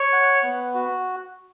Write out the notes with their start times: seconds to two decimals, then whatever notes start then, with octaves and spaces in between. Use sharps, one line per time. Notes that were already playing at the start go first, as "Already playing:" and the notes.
Already playing: C#5
0.13 F#5
0.43 B3
0.74 F#4